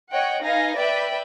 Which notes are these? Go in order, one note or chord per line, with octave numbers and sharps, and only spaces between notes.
C#5 D#5 F#5 G5
D#4 B4 F5 G#5 A#6
B4 D5 E5 G5 B5